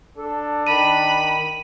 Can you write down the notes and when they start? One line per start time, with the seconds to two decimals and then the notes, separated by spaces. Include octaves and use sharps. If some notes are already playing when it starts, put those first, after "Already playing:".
0.18 D4 A4
0.67 D#3 B5 D#7